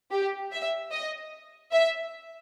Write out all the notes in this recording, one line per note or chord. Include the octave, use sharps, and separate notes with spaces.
G4
E5
D#5
E5